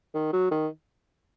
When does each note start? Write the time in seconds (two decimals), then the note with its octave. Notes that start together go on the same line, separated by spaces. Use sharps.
0.15 D#3
0.33 F#3
0.52 D#3